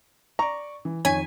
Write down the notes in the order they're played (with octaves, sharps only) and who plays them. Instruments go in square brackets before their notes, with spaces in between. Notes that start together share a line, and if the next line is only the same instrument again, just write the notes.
[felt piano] D5 C#6 [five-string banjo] A#5
[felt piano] E3
[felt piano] F2 D#3 B6 [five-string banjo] C#5 [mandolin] G#5